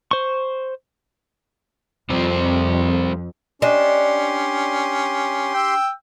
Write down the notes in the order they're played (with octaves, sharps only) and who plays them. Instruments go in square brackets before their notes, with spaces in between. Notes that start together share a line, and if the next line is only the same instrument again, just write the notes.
[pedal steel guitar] C5 C#6
[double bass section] F2 [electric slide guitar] G3 C4 C5
[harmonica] C#4 [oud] D4 D#5 [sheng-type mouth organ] G4 C6
[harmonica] G5 E6